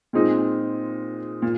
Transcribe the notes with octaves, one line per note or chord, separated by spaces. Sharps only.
A#2 G#3 C4 D#4
A#2